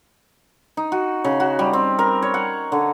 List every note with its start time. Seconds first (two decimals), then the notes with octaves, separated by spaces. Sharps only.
0.77 D#4
0.92 F#4
1.24 C#3
1.40 F#4
1.59 G3
1.73 C4
1.99 A#4
2.22 C#5
2.34 F#5
2.72 D3